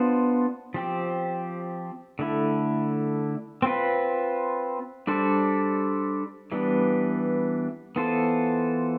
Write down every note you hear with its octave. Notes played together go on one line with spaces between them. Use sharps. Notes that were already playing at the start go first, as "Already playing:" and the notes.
Already playing: B3 D4 F4 C5
F3 C4 G4
D3 A3 E4
C4 F4 B4
G3 D4 A4 C5
E3 G3 B3 D4
E3 B3 F4 A4 C5